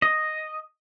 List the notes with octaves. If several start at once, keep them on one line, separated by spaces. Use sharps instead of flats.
D#5